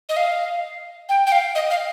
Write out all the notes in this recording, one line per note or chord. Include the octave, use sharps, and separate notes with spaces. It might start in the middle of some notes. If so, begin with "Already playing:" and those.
D#5
F5
G5
G5
F5
D#5
F5